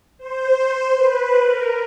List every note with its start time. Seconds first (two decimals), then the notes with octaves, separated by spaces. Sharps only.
0.18 C5
0.94 B4
1.43 A#4